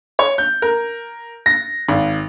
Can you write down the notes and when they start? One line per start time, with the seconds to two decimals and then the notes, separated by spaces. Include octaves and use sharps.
0.19 C#5
0.38 G6
0.62 A#4
1.46 A#6
1.89 G#1